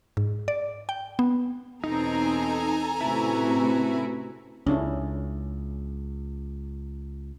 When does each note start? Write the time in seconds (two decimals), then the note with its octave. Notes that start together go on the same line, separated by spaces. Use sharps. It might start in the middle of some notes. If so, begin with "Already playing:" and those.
0.17 G#2
0.48 D5
0.89 G5
1.19 B3
1.84 E2 B2 C4 D#4 A4 G#5 A#5
3.01 A2 C3 C#4 E4 F#4 B4
4.67 C#2 C#4 D4 E4